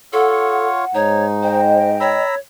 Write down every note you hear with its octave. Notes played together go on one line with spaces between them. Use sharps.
F4 A4 C#5 F#5
G#2 D#4 C#5
C5 D#5 G5
C#5 A#5 B5 E6